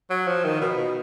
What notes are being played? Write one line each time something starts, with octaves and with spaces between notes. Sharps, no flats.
F#3
F3
D#3
B2
B2